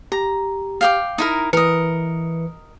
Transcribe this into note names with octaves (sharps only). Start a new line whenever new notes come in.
G4 A#5
F5 G5 D6
D#4 E4 A#4
E3 A#4 B4 D#5 C#7